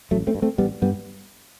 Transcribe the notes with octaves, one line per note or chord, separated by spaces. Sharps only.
A1 F#3 A3
A3 C4
G2
A3 C4
A1 G3 B3
G2 G3 B3